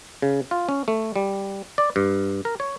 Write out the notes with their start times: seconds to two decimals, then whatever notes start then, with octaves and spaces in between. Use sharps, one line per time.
0.22 C#3
0.51 F4
0.69 C#4
0.88 A3
1.16 G3
1.78 D5
1.96 G2
2.45 A#4
2.60 C#5